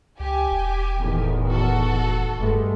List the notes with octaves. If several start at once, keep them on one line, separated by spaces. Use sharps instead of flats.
C#2 G4 G#5
E1
E1 E2 A2 D#3
F#4 A4
F1 G2 G#3 A3